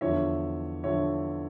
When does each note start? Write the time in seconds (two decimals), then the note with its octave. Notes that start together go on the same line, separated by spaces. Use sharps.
0.01 E2 D3 F3 C#5 E5
0.84 D3 F3 C#5 E5